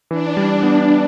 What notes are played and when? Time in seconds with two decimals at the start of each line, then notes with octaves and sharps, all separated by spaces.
0.11 E3 D4
0.37 G3
0.63 B3